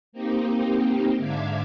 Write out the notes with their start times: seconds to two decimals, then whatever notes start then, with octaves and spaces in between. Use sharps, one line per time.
0.12 A#3 C4 D#4 G4
1.17 G#2 D3 E5 F5 D6 G#6